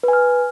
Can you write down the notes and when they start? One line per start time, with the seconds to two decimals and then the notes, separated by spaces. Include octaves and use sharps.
0.03 B4
0.08 G#5
0.13 F6